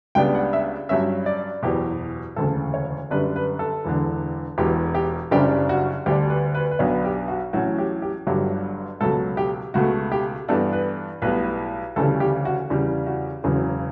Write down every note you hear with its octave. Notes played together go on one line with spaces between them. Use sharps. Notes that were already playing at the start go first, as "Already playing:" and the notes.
C#2 C#3 G3 B3 D4 G5
F#5
E5
G2 F#3 C#4 E5
D5
F#1 E2 B2 G4
E1 D2 C#3 A4
C#5
F#2 D3 G3 D4 B4
B4
A4
E1 E2 D3
E1 E2 B2 G4
G4
F#1 F#2 C#3 G3 D4 G4
F#4
D2 D3 G3 D4 G4
B4
B4
B4
B1 B2 F#3 B3 D4 C#5
G4
F#4
A1 A2 F#3 C#4 F#4
G4
G4
G1 G2 D3 F#3 G4
C#2 B2 F#3 A4
G4
C#2 B2 A3 F#4
G4
G2 E3 B3 D4 A4
B4
B1 A2 G3 B3 B4
D2 C#3 E3 G3 A4
G4
F#4
E2 C#3 G3
F#4
E1 E2 C#3 F#3